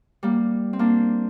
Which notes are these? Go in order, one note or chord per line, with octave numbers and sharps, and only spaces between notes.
G3 A#3
C4
A#3 D4